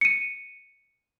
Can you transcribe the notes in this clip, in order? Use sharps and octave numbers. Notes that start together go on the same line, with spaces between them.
C#7 D#7